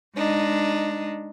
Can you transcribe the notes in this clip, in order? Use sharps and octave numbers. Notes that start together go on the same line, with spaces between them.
G#3 D4 D#4